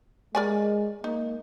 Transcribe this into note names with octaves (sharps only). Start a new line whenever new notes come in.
G#3 A#4 D5 G#5
A#3 D#4